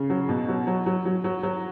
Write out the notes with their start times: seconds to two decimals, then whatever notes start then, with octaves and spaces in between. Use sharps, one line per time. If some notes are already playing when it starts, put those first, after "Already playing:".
Already playing: C#3
0.10 F#3
0.29 B2
0.48 F#3
0.67 F#3
0.86 F#3
1.05 F#3
1.24 F#3
1.43 F#3